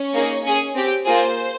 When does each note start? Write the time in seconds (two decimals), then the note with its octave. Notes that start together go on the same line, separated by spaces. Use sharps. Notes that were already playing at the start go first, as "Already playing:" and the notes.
Already playing: C#4 C#5
0.13 A#3 D#4 G#4
0.44 C#4 G#4
0.75 C4 G4
1.05 A#3 F4 G#4 C5